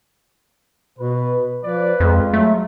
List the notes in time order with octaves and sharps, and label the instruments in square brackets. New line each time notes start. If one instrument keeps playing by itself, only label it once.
[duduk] B2 [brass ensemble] B4
[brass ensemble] F3 D5 [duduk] B4
[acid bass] F2 [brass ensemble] G#3 F4
[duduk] F#3 [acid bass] A3